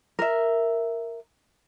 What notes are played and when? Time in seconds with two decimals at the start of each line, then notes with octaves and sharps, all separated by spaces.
0.19 A#4 E5